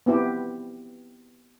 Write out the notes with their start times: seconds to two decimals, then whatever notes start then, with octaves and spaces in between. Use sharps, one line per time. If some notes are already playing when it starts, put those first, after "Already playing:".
0.06 B3 C4 E4 G4